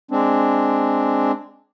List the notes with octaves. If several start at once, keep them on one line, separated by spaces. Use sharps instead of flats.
G#3 C4 D4